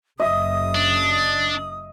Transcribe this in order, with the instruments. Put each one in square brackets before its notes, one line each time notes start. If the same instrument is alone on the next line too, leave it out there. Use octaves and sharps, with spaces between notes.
[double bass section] F#1 F#2 C#3 [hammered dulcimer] D#5 E5 [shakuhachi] D#6
[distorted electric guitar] D4